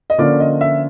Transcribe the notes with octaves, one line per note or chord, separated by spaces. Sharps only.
D#5
D3 F3 A#3 C#4 F4 D5
D#5
E5